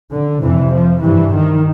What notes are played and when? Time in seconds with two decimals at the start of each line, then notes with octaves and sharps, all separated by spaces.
0.12 D3
0.42 F2 C3 E3
0.73 F3
1.03 G2 E3
1.34 D#3